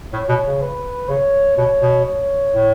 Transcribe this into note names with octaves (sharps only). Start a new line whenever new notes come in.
A2 C#5
B2
C#3
B4
C#3 C#5
B2 C#5
B2
C#5
A2